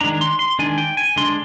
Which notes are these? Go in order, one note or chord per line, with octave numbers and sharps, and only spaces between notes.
D#3 G#3 D4 A#5
C6
C6
D#3 G#3 D4 G#5
G5
G#5
D3 G#3 D4 C6